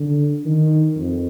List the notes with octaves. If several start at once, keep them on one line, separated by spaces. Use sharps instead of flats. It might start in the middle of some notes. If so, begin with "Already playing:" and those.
Already playing: D3
D#3
F2